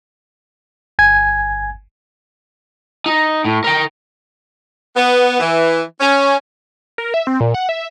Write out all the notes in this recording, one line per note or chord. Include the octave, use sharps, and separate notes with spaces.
G1 G#5 G#6
D#4
A2
A#4 G5
B3
E3
C#4
A#4
E5
C4
A#2
F#5
E5